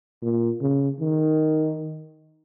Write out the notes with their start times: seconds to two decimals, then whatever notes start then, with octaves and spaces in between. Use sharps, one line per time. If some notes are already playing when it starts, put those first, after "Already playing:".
0.22 A#2
0.61 C#3
1.00 D#3